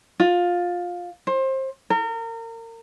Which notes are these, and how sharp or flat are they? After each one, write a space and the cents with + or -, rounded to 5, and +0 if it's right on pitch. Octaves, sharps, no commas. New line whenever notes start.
F4 +15
C5 +25
A#4 -30